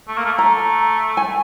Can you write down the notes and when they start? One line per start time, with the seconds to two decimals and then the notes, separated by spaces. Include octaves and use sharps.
0.08 A3
0.18 A#3
0.26 A3
0.38 A3 A#5
1.17 G#5